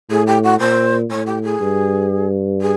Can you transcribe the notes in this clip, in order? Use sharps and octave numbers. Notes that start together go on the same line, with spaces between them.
A2 G#4
G4
F#4
A#2 C5
A2 C#5
G4
G#4
G2
G#4